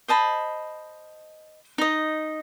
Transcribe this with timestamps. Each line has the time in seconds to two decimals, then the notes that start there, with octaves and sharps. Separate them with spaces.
0.08 C5 D#5 A5 B5
1.78 D#4 D#5